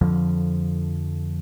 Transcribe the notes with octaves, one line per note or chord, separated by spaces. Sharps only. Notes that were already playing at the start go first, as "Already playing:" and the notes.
F2 D3 F3